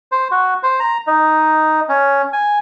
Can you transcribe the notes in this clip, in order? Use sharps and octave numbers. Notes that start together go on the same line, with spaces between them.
C5
F#4
C5
A#5
D#4
C#4
G#5